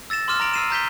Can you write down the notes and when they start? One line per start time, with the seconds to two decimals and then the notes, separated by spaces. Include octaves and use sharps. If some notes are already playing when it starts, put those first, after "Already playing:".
0.10 E6 A6 A#6 E7
0.28 C6 D6 F6 E7
0.40 A#5 F6 A#6 D7 F7 F#7
0.54 E6 F6 C7 D#7 E7
0.70 A#5 G6 B6 G7